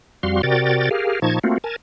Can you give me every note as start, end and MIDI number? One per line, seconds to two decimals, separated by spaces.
0.23 0.42 41
0.23 0.42 55
0.23 0.42 66
0.23 0.42 77
0.23 0.42 84
0.43 0.89 48
0.43 0.89 66
0.43 0.89 70
0.43 0.89 74
0.43 0.89 79
0.43 0.89 93
0.91 1.20 67
0.91 1.20 68
0.91 1.20 70
0.91 1.20 77
1.22 1.39 46
1.22 1.39 53
1.22 1.39 63
1.22 1.39 81
1.22 1.39 85
1.22 1.39 92
1.44 1.58 57
1.44 1.58 58
1.44 1.58 60
1.44 1.58 65
1.44 1.58 66
1.64 1.76 70
1.64 1.76 80
1.64 1.76 81